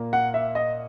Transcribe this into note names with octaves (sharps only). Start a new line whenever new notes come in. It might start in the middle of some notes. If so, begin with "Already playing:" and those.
Already playing: A#2 A#3
F#5
E5
D#5